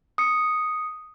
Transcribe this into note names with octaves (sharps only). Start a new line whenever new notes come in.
D#6 C#7